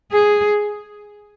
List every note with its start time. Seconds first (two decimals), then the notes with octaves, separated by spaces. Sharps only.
0.12 G#4